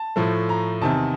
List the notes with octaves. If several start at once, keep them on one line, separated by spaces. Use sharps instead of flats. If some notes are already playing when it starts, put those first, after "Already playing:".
Already playing: A5
A2 F3 A3
A#5
E2 C3 D#3 A5